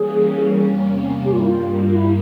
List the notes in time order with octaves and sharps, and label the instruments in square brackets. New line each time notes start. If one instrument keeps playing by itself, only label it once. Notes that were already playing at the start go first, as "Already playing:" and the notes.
Already playing: [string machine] E3 G3 A#3 C#4 [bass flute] G#4
[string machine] E2 C3 G3 A#3 C#4
[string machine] G2 G3 A#3 [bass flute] G4
[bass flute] F4
E4
F4
F4
E4